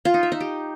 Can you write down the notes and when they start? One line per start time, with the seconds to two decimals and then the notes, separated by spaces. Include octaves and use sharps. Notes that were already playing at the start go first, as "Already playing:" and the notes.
0.05 F4
0.14 D#4
0.23 E5
0.32 D#4
0.40 G4